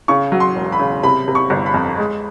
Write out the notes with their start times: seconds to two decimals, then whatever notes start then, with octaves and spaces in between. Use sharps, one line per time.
0.08 C#3 C#6
0.32 F#3
0.40 C6
0.56 E1
0.72 B5
0.79 C#3
1.03 C3 B5
1.28 C3
1.35 C#6
1.50 G1
1.66 B5
1.74 F2
1.98 G#3